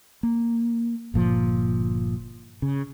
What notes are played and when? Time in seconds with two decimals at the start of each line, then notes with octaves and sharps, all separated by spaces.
0.23 A#3
1.14 G1 A#2 F3
2.62 C#3